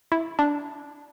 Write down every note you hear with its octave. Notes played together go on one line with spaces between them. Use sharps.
E4
D4